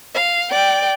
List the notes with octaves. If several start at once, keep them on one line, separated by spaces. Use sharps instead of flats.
F5
D5 G5